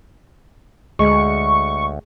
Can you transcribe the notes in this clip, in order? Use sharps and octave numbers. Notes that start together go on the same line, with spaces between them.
D2 G#3 C#6